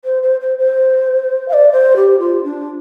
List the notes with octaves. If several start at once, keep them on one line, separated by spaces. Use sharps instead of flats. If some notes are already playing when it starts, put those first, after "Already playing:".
C5
C5
C5
C5
F5
D5
C5
G4
F4
D4